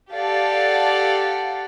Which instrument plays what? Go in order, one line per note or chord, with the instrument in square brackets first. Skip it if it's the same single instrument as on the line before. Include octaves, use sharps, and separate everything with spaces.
[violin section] G4 A4 D5 F5 F#5